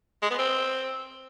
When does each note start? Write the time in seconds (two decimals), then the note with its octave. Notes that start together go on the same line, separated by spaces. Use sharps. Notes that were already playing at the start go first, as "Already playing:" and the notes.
0.23 G#3
0.30 B3
0.38 C4